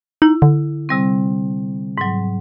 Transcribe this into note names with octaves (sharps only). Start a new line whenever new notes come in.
D#4 E4
D3
C3 G3 C4
G#2 F#3